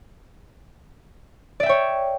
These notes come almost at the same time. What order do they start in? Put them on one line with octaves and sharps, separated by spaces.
D5 E5 G5 C#5